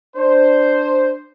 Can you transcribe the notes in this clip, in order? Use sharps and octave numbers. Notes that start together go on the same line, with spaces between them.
D4 C5